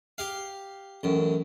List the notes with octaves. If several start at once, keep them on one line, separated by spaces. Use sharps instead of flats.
G4 F5
A1 F#2